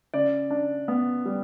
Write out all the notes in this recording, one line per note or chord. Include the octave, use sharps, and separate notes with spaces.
C#3 D5
D4
B3
G3